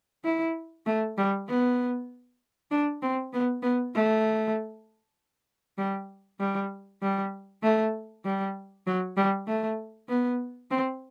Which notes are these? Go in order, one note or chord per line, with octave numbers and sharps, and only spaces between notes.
E4
A3
G3
B3
D4
C4
B3
B3
A3
G3
G3
G3
A3
G3
F#3
G3
A3
B3
C4